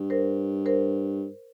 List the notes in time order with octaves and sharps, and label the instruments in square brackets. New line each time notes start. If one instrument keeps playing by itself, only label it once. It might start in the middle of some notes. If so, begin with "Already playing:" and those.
Already playing: [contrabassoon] G2
[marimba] A#4 C5
A#4 C5